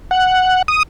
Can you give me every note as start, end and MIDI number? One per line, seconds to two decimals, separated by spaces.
0.11 0.62 78
0.68 0.83 87